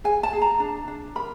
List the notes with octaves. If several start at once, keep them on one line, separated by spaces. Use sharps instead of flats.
G#4 G#5
A5
G#4
A#5
D4
D4
A#4 B5